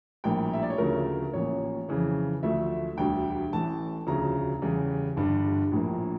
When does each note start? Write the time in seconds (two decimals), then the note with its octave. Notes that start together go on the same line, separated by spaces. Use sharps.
0.24 A#1 A2 G3 A#3 G5
0.53 E5
0.63 D5
0.70 C#5
0.78 D2 C#3 F3 A3 A#4
1.33 A1 A2 F3 A#3 C#5
1.89 F2 C#3 E3
2.43 D2 D3 F3 A3 E5
2.97 E1 D2 D3 G3 G5
3.52 A1 A2 E3 A3 A5
4.07 E1 D2 C#3 F3 A#5
4.62 E2 C#3 G3
5.16 G1 G2 D3 G3
5.71 A#1 A2 F3 A#3